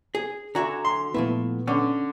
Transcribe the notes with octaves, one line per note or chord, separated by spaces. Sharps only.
G#4
D3 F#4 E5 G#5 A#5
C6
A#2 F3 A3 B3 E4
D3 C#4